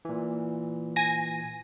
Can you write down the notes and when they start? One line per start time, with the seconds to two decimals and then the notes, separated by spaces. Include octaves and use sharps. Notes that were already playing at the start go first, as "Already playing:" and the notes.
0.05 A#2 E3
0.96 G#5 A#6